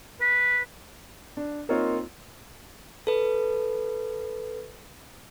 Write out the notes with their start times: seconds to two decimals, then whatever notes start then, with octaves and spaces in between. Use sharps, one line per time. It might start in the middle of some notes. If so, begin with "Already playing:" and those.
0.21 B4
1.37 D4
1.69 A#3 C4 D#4 F4 A#4 C#5
3.07 A4 B4